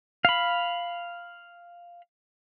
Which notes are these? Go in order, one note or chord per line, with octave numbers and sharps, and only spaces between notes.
F5 B5